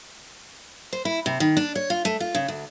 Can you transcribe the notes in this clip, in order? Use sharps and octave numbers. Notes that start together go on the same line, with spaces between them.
C5
E4
C3
D#3
D4
C#5
F4
A3
F4
C#3
D2